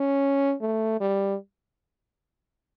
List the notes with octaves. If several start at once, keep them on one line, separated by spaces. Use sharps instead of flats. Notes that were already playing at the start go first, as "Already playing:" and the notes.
Already playing: C#4
A3
G3